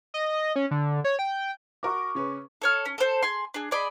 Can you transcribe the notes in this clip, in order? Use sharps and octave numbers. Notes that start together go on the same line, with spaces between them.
D#5
C#4
D3
C#5
G5
F#4 A#4 C#6 D6
C#3 C#4 B4
A4 C#5 F6
C#4
A4 C5
G#4 C6
D4 G#4
G#4 D5 D#5 B5